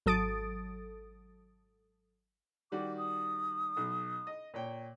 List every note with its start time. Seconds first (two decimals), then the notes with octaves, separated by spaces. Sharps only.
0.06 G#1 F#3 A4 D#6 A6 D7
2.72 D#3 G3 F#4 D6
2.98 D#6
3.77 B1
4.27 D#5
4.54 A#2 C#5 G5